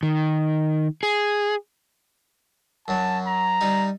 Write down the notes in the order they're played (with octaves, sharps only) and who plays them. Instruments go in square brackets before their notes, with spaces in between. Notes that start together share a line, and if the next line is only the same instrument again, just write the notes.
[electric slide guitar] D#3
G#4
[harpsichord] F#2 F#3 [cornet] A5
[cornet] A#5
[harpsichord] G3 D#4